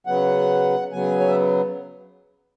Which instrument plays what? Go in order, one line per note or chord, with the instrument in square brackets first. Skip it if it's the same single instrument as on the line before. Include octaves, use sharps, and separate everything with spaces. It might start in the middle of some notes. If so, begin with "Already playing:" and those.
[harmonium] C#3 F#3 B3 F#5
C#3 F#3 B3 G#5
C#5
E5